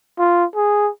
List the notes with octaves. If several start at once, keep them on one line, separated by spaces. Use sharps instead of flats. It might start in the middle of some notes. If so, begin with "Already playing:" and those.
F4
G#4